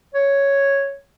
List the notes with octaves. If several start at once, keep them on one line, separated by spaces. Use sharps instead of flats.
C#5